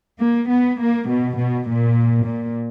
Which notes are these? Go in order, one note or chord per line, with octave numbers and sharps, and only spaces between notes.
A#3
B3
A#3
B2
B2
A#2
A#2